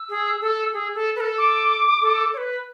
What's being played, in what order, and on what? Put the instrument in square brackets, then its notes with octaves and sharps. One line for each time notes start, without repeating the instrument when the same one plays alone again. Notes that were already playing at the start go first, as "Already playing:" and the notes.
Already playing: [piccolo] E6
[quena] G#4
A4
G#4
A4
B4
A4
[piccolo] D6
[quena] A4
C#5
B4